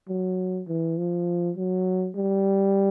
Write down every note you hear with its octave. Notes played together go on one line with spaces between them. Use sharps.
F#3
E3
F3
F#3
G3